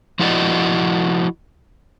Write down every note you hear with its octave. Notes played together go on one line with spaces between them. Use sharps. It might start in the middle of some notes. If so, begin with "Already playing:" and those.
F3 E4 F#4 G#4 D5 D#5